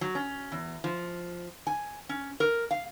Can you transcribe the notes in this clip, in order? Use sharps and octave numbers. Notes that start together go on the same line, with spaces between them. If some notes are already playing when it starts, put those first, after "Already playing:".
F#3
C#4
E2
F3
G#5
C#4
A#4
F5